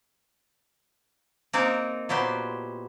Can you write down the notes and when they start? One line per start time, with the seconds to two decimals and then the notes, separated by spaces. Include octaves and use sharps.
1.53 A#3 C4 D#4 G#4 A#4
2.09 A#2 F#3 B3 G4 C5